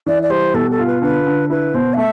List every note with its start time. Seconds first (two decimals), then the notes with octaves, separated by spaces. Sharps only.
0.06 E3 D5
0.22 D5
0.30 G3 C5
0.54 B2 A4
0.70 A4
0.79 F4
0.86 B4
1.02 D3 B4
1.26 D3
1.50 E4 B4
1.74 B2 C5
1.93 F5
1.97 A3 E5